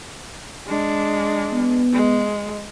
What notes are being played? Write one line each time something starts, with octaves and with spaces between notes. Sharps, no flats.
G#3 D4
B3
G#3